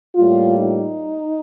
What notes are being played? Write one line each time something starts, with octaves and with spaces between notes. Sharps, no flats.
A2 G3 A#3 F4
D#4